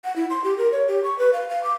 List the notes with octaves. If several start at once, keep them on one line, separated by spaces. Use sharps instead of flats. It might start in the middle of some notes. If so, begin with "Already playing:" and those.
F#5
E4
C6
G4
A#4
C#5
G4
C#6
B4
F5
F5
D6